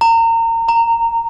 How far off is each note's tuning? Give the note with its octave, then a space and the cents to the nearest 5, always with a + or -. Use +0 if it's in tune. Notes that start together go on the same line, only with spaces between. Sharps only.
A#5 -30
A#5 -15